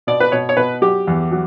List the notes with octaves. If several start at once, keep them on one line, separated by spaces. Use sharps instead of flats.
B2 D5
B4
B2 C#5
C#5
B2 B4
F#3 G4
E2
F#3